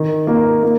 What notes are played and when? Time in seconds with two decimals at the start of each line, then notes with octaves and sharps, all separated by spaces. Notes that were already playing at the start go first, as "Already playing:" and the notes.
Already playing: D#3
0.27 A#3
0.63 A#3